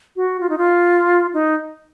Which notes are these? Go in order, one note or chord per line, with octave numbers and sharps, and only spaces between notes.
F#4
F4
D#4
F4
D#4